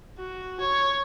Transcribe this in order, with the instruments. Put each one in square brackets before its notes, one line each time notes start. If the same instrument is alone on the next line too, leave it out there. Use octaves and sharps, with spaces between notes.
[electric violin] F#4
C#5